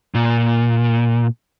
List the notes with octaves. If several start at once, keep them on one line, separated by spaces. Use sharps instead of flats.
A#2